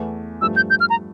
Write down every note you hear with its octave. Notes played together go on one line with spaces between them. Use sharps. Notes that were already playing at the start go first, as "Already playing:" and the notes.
Already playing: E2 E3 A3
G2 F3 A3 E6
G6
G6
F6
A#5